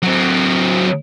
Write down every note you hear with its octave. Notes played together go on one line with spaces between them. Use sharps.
F#3 C4